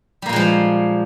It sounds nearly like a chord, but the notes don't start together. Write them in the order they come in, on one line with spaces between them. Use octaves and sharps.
G3 A#3 A#2 G#3 F3